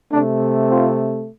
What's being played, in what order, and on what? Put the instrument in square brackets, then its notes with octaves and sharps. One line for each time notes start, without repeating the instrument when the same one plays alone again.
[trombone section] C3 A3 D4
C4 F4